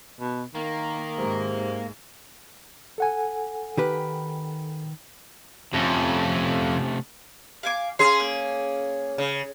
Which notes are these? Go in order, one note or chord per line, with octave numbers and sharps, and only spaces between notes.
B2
D#3 A#3
G#2 C3 G#3
A4 F#5 G#5
D#3 G4 B4
F2 C3 A3 C#4
F5 G#5 D6
C#4 G#4 F5 A#5 C6
A#3
C#3